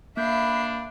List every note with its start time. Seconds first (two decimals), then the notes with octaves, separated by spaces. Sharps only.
0.17 A#3 D4 E5 F5 B5 G6 C7